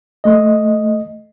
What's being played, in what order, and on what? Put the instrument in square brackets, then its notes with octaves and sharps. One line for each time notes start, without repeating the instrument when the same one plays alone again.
[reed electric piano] A3 D#5